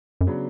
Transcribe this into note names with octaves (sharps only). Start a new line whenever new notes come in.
F#2
C#3 F#3 B3 D4